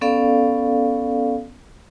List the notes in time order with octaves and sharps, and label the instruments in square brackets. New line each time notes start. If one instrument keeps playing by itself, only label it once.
[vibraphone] B3 C#4 A4 D5 F5